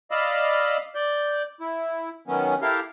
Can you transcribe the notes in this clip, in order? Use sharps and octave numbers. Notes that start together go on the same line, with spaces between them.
D5 D#5 F5 B5 E6
D5 G6
E4
D#3 F#3 B3 C#4
E4 G4 A4 A#4 F5